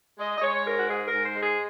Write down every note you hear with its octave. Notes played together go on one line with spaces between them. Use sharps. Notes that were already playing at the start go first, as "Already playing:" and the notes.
G#3 D#5
D#5
G#3 C#5
G#2 A#4
F#4
G#2 G#4
A#4
G#2
C5
G#3
G#4